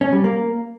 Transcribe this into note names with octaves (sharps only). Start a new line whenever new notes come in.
C#4
G3
A#3